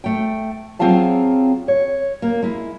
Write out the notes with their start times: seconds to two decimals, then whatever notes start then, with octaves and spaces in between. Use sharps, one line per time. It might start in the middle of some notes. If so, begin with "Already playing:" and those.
0.04 A3 G5
0.79 F#3 C4 F4 G#4 F5 A5
1.68 C#5
2.22 A#3
2.42 G#3 E4